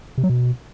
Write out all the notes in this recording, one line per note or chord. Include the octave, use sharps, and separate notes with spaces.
C3
F#3
B2